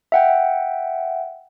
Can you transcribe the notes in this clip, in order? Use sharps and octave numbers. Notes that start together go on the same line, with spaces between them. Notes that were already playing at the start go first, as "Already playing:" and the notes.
E5 F#5 G5